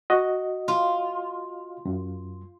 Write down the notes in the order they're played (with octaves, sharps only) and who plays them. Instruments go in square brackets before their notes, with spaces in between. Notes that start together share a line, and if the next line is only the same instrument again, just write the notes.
[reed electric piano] F#4 D#5
[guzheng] F4
[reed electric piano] F#2